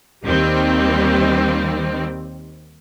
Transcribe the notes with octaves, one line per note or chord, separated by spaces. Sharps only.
D#2 D#3 G3 C4